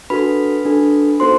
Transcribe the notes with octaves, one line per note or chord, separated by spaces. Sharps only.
D4 F#4 A4 B4 B5
D4 F#4 A4
B3 D#4 F#4 A4 C5 C6